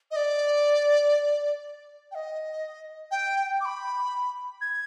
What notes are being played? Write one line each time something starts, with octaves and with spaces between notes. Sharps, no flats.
D#5
D5
G5
D#5
G5
D6
B5
G#6